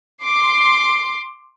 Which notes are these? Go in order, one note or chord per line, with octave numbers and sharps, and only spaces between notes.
C6 D6 C7